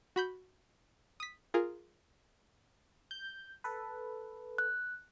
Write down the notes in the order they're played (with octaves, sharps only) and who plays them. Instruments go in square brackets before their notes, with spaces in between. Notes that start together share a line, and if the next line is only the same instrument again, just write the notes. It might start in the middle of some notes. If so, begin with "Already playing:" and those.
[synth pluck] F#4 B5 G6
D#6 B6
F4 G#4 A#4
[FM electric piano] G6
A4 B4
[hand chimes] F#6